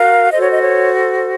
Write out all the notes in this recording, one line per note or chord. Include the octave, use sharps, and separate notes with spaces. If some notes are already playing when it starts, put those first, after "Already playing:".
Already playing: F#4 A#4 F5
F#4 A4 C5 D#5
C#5
D#5
C#5